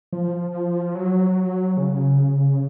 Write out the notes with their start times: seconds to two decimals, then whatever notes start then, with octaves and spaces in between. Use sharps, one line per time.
0.13 F3
0.95 F#3
1.77 C#3